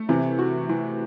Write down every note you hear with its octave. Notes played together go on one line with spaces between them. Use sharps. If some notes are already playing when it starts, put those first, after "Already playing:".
Already playing: A3
C3 E3
F#4
E3